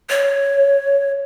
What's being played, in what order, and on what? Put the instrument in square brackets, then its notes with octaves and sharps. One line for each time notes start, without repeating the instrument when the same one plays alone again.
[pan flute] C#5